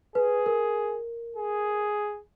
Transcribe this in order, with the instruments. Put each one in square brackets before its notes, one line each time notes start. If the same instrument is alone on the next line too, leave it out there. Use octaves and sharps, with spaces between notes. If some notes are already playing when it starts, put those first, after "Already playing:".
[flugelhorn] G#4 [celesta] B4
[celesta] A#4
[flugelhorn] G#4